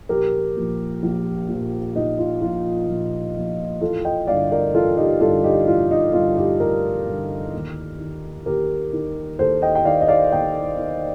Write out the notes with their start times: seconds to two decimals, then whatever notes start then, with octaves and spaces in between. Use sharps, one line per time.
0.09 A#1 G4 A#4
0.56 A#2 F3
1.03 A#1
1.49 A#2 F3
1.96 A#1 D#4
2.19 F4
2.42 A#2 F3 F4
2.88 A#1
3.36 A#2 F3
3.81 A1 F4 A4
4.05 D#5 G5
4.27 G2 D3 D5 F5
4.52 A#4 D5
4.74 A1 F4 A4
4.97 D#4 G4
5.21 G2 D3 F4 A4
5.44 D#4 G4
5.67 A1 F4
5.91 D#4
6.13 G2 D3 F4
6.36 D#4 G4
6.60 A1 G4 A#4
7.06 G2 D3
7.54 D#2
8.00 D#3
8.46 D#2 G4 A#4
8.93 D#3
9.39 D#2 A4 C5
9.62 D#5 G5
9.75 G5
9.85 D#3 D5 F5
10.01 D#5
10.08 D5 F5
10.31 D#2 D#5 G5
10.78 D#3